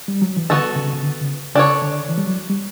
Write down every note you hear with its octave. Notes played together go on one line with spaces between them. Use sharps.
G3
F#3
E3
D3 B3 F#4 A4
C#3
C#3
D3
C#3
C#3 D4 A4 C#5
D3
E3
G3
F#3
G3